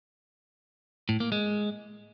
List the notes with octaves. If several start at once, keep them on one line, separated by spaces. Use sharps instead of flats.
A2
A#3
G#3